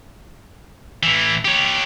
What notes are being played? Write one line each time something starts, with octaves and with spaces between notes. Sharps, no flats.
A2 E3
G4 C#5